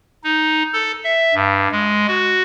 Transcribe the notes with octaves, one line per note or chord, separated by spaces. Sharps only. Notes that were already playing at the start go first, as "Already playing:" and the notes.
D#4
A4
E5
G2
G#3
F#4